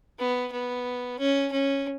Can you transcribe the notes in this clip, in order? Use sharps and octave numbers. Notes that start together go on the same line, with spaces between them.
B3
B3
C#4
C#4